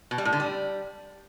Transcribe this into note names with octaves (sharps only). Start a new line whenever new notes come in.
B2
G3
A2
D3
G3